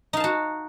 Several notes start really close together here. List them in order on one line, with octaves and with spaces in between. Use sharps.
D#4 F5 A5 F#4